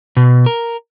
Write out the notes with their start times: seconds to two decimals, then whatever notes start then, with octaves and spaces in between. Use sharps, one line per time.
0.17 B2
0.46 A#4